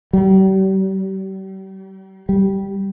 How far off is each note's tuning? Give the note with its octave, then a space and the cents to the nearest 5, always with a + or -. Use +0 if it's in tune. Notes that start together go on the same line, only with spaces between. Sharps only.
G3 -40
G3 -10